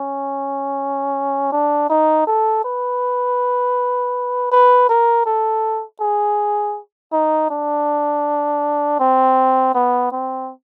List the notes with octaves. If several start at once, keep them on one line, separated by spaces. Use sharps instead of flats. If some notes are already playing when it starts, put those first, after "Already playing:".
Already playing: C#4
D4
D#4
A4
B4
B4
A#4
A4
G#4
D#4
D4
C4
B3
C4